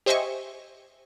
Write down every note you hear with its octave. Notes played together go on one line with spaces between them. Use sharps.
G4 C5 D#5 E5 G#5 C#6